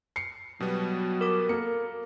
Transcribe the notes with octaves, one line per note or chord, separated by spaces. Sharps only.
C7 C#7
B2 F#3 G3 B3
A#4 D6
A#3 A4 C#7